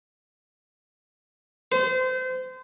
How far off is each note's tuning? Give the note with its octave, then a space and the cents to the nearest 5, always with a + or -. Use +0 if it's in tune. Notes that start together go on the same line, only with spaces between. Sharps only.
C5 -30